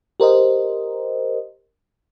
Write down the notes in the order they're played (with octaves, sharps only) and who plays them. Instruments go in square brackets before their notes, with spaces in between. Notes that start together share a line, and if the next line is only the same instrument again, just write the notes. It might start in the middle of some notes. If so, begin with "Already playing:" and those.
[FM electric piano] G4 A#4 C5 D#5